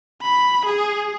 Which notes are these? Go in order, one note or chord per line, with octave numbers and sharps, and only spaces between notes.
B5
G#4